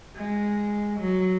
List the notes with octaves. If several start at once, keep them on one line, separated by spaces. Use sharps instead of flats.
G#3
F#3